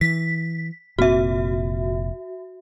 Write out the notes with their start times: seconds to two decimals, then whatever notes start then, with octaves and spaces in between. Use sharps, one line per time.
0.01 E3 B6
0.99 F1 A#2 C4 F#4 E5